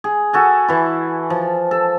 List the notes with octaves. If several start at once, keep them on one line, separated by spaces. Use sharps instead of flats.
G#4
F#4 A4 G#5
E3 E4
F3
A4